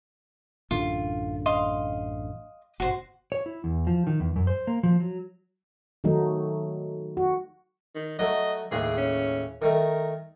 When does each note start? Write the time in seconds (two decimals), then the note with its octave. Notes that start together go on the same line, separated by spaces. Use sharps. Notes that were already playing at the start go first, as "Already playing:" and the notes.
0.71 A1 F#2 D3 F4
1.46 D#5 F5 C6
2.80 G1 B2 F#4 C5
3.32 C#5
3.46 E4
3.64 E2
3.87 F3
4.07 D#3
4.20 E2
4.36 F#2
4.47 C5
4.67 A#3
4.83 F3
5.00 F#3
6.04 D#3 F#3 A3 D#4
7.17 F#4
7.95 D#3
8.19 F#3 A3 D#5
8.71 D#2 A2 C#3 G#4
8.97 C#4
9.62 D#3 A3 A#4